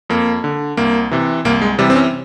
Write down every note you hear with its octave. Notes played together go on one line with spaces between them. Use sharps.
F2 A#3
D3
C2 A#3
C3 E3
C2 A#3
G#3
C3 E3 G3
C4
C#4